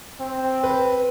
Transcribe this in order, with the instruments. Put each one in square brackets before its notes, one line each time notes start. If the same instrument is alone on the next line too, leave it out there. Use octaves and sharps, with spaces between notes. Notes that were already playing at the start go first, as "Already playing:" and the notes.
[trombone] C4
[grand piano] B4